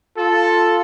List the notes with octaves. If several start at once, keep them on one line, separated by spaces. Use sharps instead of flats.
F4 A4